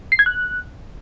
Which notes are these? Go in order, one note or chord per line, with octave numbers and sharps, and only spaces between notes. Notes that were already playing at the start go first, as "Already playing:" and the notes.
C7
G#6
F#6